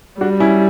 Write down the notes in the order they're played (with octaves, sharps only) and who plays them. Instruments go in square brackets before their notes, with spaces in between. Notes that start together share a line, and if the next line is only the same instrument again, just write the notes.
[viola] G3 [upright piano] D4 F#4
[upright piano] C#4 E4